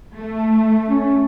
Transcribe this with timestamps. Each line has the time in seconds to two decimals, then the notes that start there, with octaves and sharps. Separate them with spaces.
0.17 A3
0.88 C#4